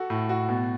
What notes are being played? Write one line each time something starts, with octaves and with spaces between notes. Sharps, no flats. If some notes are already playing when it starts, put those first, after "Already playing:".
Already playing: F#4 A4
A2
F#4
B2